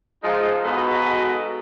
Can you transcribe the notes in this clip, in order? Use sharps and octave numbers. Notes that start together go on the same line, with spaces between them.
F3 G#3 D#4
G#2 B2 F#4 A4 B4 D#5